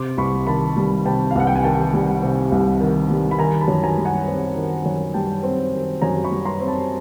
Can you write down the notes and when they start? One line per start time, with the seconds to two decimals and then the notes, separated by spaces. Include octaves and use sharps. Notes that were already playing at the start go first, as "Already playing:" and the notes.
Already playing: C3 C6 D6
0.17 C2 B5 C#6
0.47 D#3 A5 B5
0.76 G3
1.05 C3 G5 A5
1.31 F5
1.35 C2 F#5
1.47 G5
1.56 G#5
1.64 D#3 G5 A5
1.94 G3
2.23 C3
2.52 C2
2.81 D#3
3.10 G3
3.31 B5
3.39 D#3 G#5 A#5
3.61 A5 B5
3.68 F#2
3.83 G#5 A#5
3.98 G3
4.05 F#5 G#5
4.27 C4
4.56 D#3
4.86 F#2
5.14 G3 G5 A5
5.43 C4
5.73 D#3
6.02 F#2 G#5 A#5
6.24 B5 C#6
6.31 G3
6.45 A#5 C6
6.60 C4
6.68 A5 B5